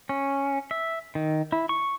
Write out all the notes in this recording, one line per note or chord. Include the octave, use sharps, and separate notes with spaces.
C#4
E5
D#3
E4
C#6